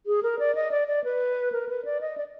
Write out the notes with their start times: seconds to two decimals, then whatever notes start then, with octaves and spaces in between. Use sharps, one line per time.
0.06 G#4
0.23 A#4
0.39 D5
0.55 D#5
0.71 D5
0.88 D5
1.04 B4
1.52 A#4
1.69 B4
1.85 D5
2.01 D#5
2.18 D5